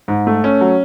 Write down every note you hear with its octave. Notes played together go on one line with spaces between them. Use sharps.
G#2
A3
C#4
F#3